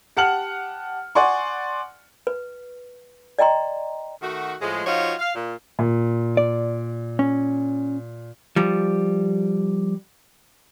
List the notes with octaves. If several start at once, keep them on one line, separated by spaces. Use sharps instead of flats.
G4 F#5 A5 F6 C#7 F#7
D5 F#5 G#5 C6 C#6
B4
D5 D#5 G5 A#5 C6
D#3 A3 F#4
A2 F3 G#3
F3 D#4 F4 F#4 C#5
F5
A#2
A#2
D5
C#4
F3 G3